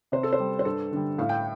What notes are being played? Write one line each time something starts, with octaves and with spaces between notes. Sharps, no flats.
C3 C5
A4
C5
G3
C5
G2 A4
D3 G3
A2 F5
G5